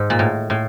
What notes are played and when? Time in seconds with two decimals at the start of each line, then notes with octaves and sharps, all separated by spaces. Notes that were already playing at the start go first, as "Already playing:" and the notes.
Already playing: G#2
0.10 A#2
0.19 A2
0.50 A2